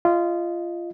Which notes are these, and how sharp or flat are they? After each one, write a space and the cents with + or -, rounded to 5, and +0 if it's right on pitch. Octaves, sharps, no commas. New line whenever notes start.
F4 -20 D#5 +0